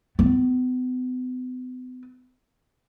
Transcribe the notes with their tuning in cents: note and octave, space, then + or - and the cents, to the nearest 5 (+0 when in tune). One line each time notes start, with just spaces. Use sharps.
B3 +40